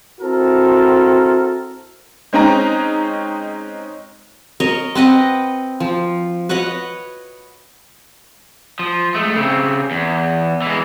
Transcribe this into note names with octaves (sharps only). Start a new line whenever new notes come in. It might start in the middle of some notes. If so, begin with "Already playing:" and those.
C4 E4 F#4 A4 A#4
G#3 C4 C#4 D#4 A#5
A#4 C#5 D#5
C4 B4 D#5 F#5
F3
B4 C#5 D#5 F#5
F3
G#3 A3
C#3 C4
E2
E3 G#3